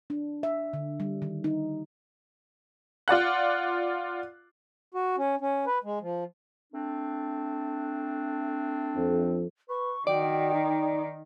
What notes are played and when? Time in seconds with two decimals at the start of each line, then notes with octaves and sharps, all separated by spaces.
0.10 D4
0.43 E5
0.73 D3
1.00 G3
1.22 D#3
1.44 D#4
3.08 F4 D5 F#5 F#6
4.94 F#4
5.18 C#4
5.41 C#4
5.66 B4
5.84 G#3
6.01 F3
6.73 A3 C4 D4
8.95 F2
9.69 B4 C#6
10.07 D#3 F#4 D5 G5
10.54 D#4